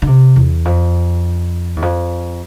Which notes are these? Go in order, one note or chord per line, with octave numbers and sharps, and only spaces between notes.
D3
C3
E2
F2
E2
F2